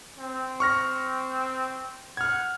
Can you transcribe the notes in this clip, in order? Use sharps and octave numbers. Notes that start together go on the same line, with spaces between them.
C4
C#6 F6 A#6
F#5 F6 G#6